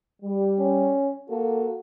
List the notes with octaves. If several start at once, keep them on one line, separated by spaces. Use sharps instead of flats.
G3
C#4
A#3 F#4 A4